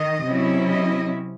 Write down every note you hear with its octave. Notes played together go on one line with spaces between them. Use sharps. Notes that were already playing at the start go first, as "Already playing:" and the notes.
Already playing: D#3 D#5
C3 F#3 C#4 E4
D#5